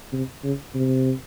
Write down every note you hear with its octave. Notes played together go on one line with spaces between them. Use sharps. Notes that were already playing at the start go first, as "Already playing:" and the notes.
C3
C#3
C3